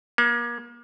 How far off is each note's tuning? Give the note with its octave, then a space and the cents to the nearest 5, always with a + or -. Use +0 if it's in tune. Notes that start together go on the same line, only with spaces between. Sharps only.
A#3 +35